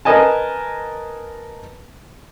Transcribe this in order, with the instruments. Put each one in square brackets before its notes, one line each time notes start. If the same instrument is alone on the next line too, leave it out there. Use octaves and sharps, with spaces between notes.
[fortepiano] A#4 B4 D#5 G#5 A5